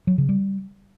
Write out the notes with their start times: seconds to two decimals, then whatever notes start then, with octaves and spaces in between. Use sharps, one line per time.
0.07 F#3
0.18 C#3
0.29 G3